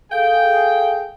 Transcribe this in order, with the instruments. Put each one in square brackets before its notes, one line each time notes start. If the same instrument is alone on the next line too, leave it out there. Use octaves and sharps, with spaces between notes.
[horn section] G#4 G5 [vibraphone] A4 F5